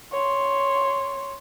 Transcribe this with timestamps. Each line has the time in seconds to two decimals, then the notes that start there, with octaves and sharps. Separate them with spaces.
0.12 C#5 C6